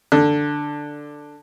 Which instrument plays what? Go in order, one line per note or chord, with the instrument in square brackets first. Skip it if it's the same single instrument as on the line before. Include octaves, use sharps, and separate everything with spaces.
[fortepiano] D3